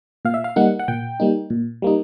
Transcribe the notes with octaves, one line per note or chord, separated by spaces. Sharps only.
A#2 F5
E5
F5
G3 A#3 D#4 F#5
F#5
A#2 G5
G3 A#3 D#4
A#2
G3 A#3 D#4